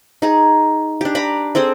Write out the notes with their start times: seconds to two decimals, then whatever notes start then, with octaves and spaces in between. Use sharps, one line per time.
0.22 D#4 G#4
1.01 D4 G4
1.15 D5 A#5 B5
1.55 C4 G#4 A4 C5